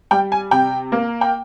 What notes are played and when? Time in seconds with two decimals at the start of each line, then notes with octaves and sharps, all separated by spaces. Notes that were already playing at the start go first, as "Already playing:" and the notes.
0.11 G3 G5
0.32 G#5
0.51 C3 G5
0.92 A#3
1.21 G5